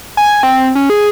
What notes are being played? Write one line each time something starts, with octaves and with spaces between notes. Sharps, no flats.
G#5
C4
C#4
G#4